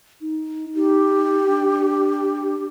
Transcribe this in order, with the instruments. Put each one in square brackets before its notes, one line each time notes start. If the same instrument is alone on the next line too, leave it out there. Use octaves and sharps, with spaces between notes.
[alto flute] D#4
[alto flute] D#4 [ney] G4
[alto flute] D4